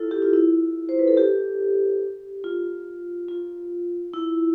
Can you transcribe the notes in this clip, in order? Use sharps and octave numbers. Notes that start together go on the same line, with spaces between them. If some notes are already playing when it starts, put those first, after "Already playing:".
Already playing: E4 F4 A4
G4
F4
E4
C5
B4
A4
G4
F4
F4
E4